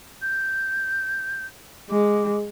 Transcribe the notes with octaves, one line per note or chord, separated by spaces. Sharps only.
G6
G#3 D6